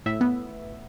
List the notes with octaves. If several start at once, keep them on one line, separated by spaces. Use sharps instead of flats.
A2 E5
B3